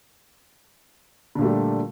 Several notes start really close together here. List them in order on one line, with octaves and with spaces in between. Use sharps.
D3 A#2 A3 G3